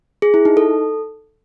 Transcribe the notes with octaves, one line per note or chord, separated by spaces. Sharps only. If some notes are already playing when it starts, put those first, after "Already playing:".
G#4
E4
D#4
A4